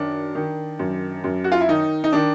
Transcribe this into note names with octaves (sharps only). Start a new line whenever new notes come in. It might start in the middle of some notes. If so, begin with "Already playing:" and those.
Already playing: F#2 D#3 D4
D#3
F#2
F#2
F#4
F4
E4
D#3 D#4
D#4
D#3 D4